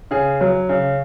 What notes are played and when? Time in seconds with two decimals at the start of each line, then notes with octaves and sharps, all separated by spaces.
0.11 C#3 G#4
0.41 F#3
0.69 C#3